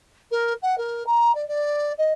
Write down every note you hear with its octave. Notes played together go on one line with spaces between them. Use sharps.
A#4
F#5
A#4
A#5
D5
D5
D#5